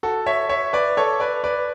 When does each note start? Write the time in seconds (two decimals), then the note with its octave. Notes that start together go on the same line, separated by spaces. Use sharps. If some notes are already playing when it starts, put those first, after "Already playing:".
0.03 F#4 A4
0.26 C#5 E5
0.49 C#5 E5
0.73 B4 D5
0.97 A4 C#5
1.20 B4 D5
1.44 B4 D5